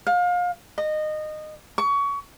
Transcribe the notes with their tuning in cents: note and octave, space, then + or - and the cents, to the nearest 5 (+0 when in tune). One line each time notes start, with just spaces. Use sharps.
F5 +30
D#5 -20
C#6 +25